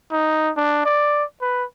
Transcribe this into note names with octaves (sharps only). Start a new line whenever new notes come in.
D#4
D4
D5
B4